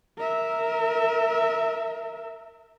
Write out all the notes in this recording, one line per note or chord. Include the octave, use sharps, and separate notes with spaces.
A#4 E5